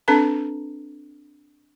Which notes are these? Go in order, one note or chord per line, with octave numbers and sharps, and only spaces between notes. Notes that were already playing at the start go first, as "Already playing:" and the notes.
C4 D4 A4 B4 A5 A#5